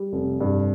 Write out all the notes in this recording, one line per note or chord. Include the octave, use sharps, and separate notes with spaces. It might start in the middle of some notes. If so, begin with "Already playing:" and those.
Already playing: G3
F1
G2